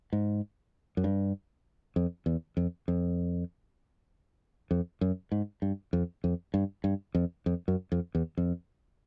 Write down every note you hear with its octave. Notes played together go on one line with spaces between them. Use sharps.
G#2
F#2
G2
F2
E2
F2
F2
F2
F#2
G#2
G2
F2
F2
G2
G2
F2
F2
F#2
F2
E2
F2